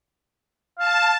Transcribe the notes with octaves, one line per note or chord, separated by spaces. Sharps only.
F5 A5